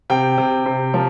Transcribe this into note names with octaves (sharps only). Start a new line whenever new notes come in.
C3 G5
C3
C3
F3